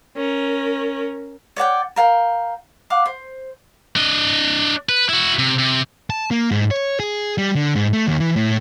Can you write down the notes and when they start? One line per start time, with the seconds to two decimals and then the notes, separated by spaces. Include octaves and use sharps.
0.16 C#4 A#4
1.56 C#5 D5 F#5 G5
1.96 A#4 F5 G5
2.90 F5 F#5 D6
3.06 C5
3.97 D4 D#5
4.89 B4
5.09 E4 F#4
5.39 C3
5.59 C3
6.10 A5
6.31 A#3
6.51 G#2
6.71 C#5
7.00 G#4
7.38 G3
7.55 D3
7.75 G#2
7.93 A3
8.07 D#2
8.20 E3
8.36 A2